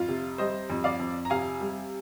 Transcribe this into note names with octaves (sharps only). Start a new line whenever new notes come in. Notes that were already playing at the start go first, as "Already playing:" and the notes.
Already playing: F2 F4
C3
G3 C5 D#5
F2
D5 F5
F2
A#5
C3 F5 G#5
G3